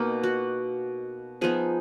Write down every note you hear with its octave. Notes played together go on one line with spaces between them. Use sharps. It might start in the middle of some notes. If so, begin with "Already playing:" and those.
Already playing: B2 A#3 D#4
F#4
F3 B3 D#4 G#4